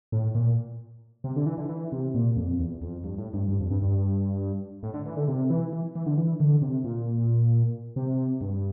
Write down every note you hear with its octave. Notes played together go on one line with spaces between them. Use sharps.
A2
A#2
C3
D3
E3
D3
E3
C3
A#2
F2
E2
F2
G2
A2
G2
G2
F2
G2
G2
A2
D3
E3
D3
C3
E3
E3
E3
D3
E3
D3
C3
A#2
C3
G2